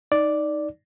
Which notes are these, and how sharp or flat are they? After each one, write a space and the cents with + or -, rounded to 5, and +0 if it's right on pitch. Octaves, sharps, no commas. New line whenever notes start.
D#4 +0 D5 +0